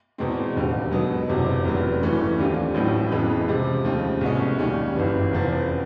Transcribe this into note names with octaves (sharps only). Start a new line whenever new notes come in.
E2 B2 G#3 C4
E1 D#2 D3 G3
B2 F#3 B3 D#4
F#1 E2 C3 F3
F1 E2 C#3 F#3 A3
G2 E3 A3 C#4
D#2 D3 G3 C4 F4
A1 A2 F#3
F2 C#3 E3 G#3 B3
C3 F3 G#3
D#2 C#3 F3 A3
C2 B2 G#3 C#4
D#2 D#3 G3 A#3 C#4
G1 F#2 C#3 E3
F1 E2 C#3 F3